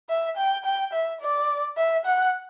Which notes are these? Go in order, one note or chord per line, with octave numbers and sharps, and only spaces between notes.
E5
G5
G5
E5
D5
E5
F#5